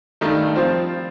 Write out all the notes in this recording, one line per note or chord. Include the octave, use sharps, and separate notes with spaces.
G2 D#3 A3 D#4
F3 C4 F4 C5